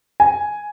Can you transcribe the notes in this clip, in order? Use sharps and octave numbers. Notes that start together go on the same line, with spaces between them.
G#5